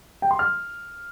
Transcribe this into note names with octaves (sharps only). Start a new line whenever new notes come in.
G5
C6
F6